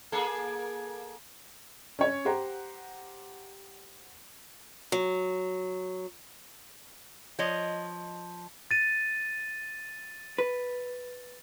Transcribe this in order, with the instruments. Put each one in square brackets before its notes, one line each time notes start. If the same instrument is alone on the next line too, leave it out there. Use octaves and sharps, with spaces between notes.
[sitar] A#3 G#4 A4
[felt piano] C#4 C#5
G4 C5 F#5 A#5
[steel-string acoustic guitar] F#3
[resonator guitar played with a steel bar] F3 C#5 D#5
[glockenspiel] A6 D#7
[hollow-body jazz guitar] B4